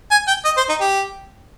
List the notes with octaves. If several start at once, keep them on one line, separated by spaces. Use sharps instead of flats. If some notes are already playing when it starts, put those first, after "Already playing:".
G#5
G5
D#5
C5
D#4
G4